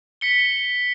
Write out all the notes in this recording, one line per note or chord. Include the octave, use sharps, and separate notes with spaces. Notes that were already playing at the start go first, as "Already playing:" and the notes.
B6 C#7 G7